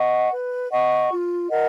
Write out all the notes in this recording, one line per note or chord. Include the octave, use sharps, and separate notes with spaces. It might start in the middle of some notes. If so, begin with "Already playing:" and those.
Already playing: D#5 F#5 C#6
B4
D#5 F#5 C#6
F4
A#4 D#5 F#5